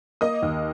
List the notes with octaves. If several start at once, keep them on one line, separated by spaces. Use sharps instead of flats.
A#3 D#5 D#6
D#2